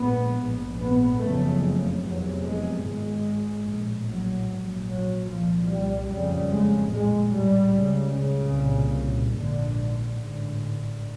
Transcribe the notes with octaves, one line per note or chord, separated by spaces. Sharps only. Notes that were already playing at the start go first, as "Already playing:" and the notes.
Already playing: A#1 G#2 B3
A#1 G#2
B3
F#1 F2 C#3 A3
F1 E2 C3 F#3
G#3
G#1 G#2 G#3
A#1 A2
F#3
A#1 G#2
F#3
C2 A#2 F3
G3
F#1 F2 C#3 G3
G#3
A#1 A2 G#3
G3
C#2 C#3
C#3
C2 A#2
A#1 G#2 D3
A1 G#2 D3